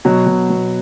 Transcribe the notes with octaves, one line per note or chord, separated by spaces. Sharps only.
B2 F#3
B2
B2